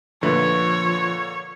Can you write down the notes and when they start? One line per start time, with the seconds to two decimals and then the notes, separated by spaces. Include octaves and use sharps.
0.23 A#2 D3 F3 A3 B4 C#5